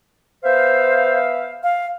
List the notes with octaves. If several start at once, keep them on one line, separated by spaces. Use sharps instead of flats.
B3 C5 E5 F5
F5